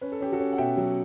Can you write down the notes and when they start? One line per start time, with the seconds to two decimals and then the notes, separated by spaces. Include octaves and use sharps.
0.01 C#4 B4
0.12 A4
0.20 C#4 G4
0.32 F#4 A4
0.39 C#4
0.52 F#5
0.58 B2 E5 G5
0.77 F#3